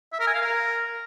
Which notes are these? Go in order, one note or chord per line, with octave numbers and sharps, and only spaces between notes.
E5
A#4
G#5
F5
A#4